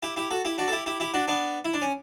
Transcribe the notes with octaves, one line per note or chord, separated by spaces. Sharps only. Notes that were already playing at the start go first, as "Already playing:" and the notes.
E4 G4
E4 G4
F#4 A4
E4 G4
D4 F#4
A4
E4 G4
E4 G4
E4 G4
D4 F#4
B3 D4
E4
D4
C#4